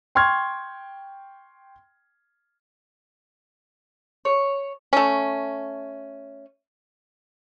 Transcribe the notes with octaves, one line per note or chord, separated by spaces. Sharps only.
G5 C6 C#6 F6 G#6
C#5
A3 C#4